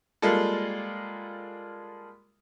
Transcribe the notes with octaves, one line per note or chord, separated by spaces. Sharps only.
G3 G#3 A#3 F4 A4